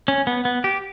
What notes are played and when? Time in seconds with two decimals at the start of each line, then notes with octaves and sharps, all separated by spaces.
0.08 C#4
0.27 B3
0.45 B3
0.64 G4